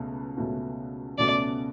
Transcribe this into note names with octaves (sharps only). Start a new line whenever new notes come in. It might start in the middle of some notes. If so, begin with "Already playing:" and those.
Already playing: C#2 B2 A3 C#4
C#2 B2 A3 C#4 F#4
C#2 B2 A3 C#4 F#4 D5